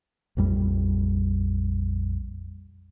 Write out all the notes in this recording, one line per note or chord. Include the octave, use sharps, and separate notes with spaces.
A#1 F2 G3